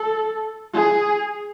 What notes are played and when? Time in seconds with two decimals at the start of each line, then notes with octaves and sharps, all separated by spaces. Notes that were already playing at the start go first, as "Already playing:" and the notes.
Already playing: A4
0.74 G#4